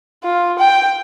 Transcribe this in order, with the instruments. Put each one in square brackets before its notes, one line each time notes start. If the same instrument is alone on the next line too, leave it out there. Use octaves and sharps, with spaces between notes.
[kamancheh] F4
G5